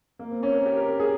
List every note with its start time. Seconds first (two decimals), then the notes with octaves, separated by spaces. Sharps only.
0.19 A#3
0.31 C4
0.43 C#4
0.54 A#4
0.66 G4
0.77 A#4
0.88 A#4
0.99 G#4